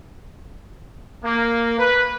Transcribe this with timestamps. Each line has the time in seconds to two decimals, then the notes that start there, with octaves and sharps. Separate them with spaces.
1.24 A#3
1.79 B4